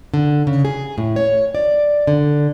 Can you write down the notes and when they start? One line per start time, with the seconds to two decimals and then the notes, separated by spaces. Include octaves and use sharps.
0.14 D3
0.47 C#3
0.65 G#4
0.98 A2
1.16 C#5
1.55 D5
2.07 D3